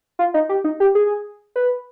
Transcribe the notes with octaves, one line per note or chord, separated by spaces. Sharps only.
F4
D#4
G4
D#4
G4
G#4
B4